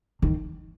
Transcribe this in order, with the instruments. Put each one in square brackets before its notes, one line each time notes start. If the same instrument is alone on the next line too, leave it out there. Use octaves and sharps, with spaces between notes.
[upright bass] D#3